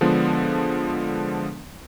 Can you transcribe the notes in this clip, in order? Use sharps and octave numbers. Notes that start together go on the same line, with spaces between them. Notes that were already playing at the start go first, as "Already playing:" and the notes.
D3 F3 G#3 B3 D4